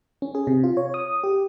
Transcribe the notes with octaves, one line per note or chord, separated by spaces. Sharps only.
C#4
G#4
C3
F4
C#5
D#6
G4